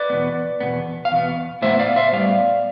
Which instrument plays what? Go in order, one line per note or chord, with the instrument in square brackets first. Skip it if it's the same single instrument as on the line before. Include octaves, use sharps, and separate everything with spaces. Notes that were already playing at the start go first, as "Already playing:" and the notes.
Already playing: [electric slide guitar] B4 D5
E2 B2 B3
E2 B2 B3
F5
E2 B2 B3
A2 G3 C5 E5
B3
D5 F5
C5 E5
A2 G3 B3 D5 F5